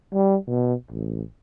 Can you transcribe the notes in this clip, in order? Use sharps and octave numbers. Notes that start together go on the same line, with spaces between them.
G3
B2
A1